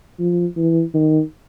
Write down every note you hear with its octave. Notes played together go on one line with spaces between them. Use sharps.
F3
E3
D#3